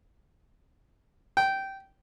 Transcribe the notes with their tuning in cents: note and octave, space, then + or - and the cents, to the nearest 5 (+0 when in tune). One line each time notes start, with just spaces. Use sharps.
G5 -15